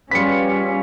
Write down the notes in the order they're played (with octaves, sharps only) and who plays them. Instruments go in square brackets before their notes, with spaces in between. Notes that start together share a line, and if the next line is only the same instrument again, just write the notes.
[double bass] G3 [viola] C#4 [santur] F4 G#4 B4 [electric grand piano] B6 C#7